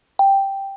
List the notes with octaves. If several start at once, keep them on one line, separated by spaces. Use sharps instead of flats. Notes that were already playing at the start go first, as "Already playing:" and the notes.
G5